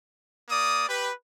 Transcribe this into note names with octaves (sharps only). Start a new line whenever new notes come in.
A#3 D5 D#6
G4 B4